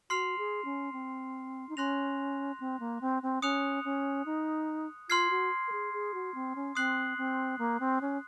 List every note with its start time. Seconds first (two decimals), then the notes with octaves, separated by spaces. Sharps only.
0.10 F#4 C6 F6 C7 F7
0.38 G#4
0.65 C#4
0.93 C4
1.69 D#4
1.77 C#4 C6 F#6 A#6 F7
2.60 C4
2.80 A#3
3.01 C4
3.23 C4
3.42 C#4 D#6 F#6 C#7 F7
3.85 C#4
4.26 D#4
5.09 F4 C6 F6 G#6 C7
5.30 F#4
5.67 A#4
5.72 G#4
5.93 G#4
6.14 F#4
6.35 C4
6.56 C#4
6.75 C4 D#6 F#6 C7 F#7
7.18 C4
7.58 A#3
7.80 C4
8.01 C#4